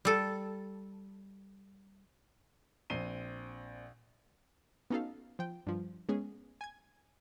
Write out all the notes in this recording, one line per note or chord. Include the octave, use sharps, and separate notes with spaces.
G3 A4
A#1 C4 C7 D#7 G7
B3 C#4 D#4 F#4 A4 F5
F3 G5
G2 F3
G#3 B3 C#4 G#4
G#5 G#6